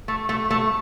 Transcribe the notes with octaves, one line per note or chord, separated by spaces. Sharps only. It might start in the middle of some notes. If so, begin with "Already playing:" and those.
A3
A3
A3